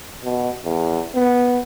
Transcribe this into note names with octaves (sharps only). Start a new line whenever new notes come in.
B2
E2
B3